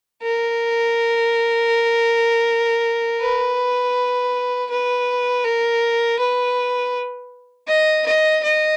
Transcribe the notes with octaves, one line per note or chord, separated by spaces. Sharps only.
A#4
B4
B4
A#4
B4
D#5
D#5
D#5